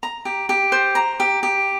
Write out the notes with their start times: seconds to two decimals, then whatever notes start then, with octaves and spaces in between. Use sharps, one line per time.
0.03 A#5
0.25 G4
0.49 G4
0.72 C5
0.95 A#5
1.20 G4
1.43 G4